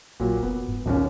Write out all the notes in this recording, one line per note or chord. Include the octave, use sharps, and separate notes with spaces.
A#1 A#2 F#3 A#3
F1 B3
G#2
D#1 A#1 D#2 C#4